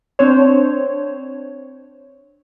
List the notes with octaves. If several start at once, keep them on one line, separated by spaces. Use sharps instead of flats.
C4 D4 C5 C#5